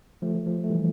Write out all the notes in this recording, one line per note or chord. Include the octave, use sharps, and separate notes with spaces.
F3 A3
F3
F3
F3
A3
E3 G3